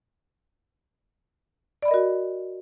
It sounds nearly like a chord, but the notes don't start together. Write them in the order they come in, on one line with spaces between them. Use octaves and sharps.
D5 B5 D#5 A#4 F#4